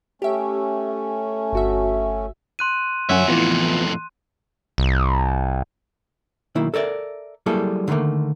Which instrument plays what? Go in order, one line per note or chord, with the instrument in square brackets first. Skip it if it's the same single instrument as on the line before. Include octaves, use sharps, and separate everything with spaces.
[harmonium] A3 C#4 [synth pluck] G4 E5
[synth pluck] G1 F#4 E5
[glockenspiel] C6 F#6 D#7
[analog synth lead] F#2 [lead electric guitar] D3 E5 [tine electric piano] C#5 F#5 G#5
[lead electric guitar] F2 A2 [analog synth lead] E3 [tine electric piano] B3 F4
[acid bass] C2
[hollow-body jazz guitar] B1 D#3 A#3 E4
A4 A#4 D5 E5
F#3 G3 A#3 E4 G#4 A4
D3 D#3 F#3 A3 A#3